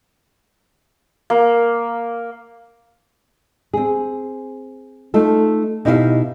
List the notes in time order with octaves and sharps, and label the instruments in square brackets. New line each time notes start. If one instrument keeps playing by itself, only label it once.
[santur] A#3
[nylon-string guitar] C4 G#4
A3 D#4 F4 A4
B2 D#4 E4 G4 D5 F5